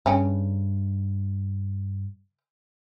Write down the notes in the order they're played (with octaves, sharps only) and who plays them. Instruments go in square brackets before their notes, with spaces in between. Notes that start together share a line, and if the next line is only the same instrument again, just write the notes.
[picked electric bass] G2 [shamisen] C#3 C#4 G5